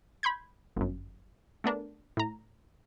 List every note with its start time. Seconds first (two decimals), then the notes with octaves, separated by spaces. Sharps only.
0.23 B5 C6 G6 G#6
0.76 G1 F#2
1.64 A3 B3 D4 A#4
2.17 A2 A#5